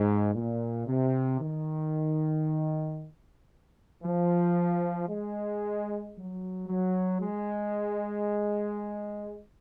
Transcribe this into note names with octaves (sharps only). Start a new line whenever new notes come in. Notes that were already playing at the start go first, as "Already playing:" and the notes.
Already playing: G#2
A#2
C3
D#3
F3
G#3
F#3
F#3
G#3